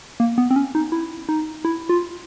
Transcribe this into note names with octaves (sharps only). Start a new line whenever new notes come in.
A#3
B3
C4
C#4
D#4
E4
D#4
E4
F4